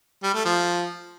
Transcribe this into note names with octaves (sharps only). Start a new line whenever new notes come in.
G3
A3
F3